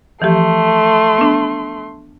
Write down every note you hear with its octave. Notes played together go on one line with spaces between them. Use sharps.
E3 F3 A3 G4 C6
B3 D4